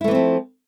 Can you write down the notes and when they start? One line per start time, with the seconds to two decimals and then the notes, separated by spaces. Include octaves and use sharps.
0.01 E4
0.04 A3
0.08 E3
0.11 C4
0.15 F3